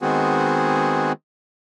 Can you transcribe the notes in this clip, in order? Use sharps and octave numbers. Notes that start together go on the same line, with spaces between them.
D#3 G#3 B3 C4 F#4 G#4